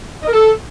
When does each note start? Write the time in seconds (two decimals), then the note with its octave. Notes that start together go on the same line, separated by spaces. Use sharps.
0.22 D#5
0.27 A#4
0.33 A4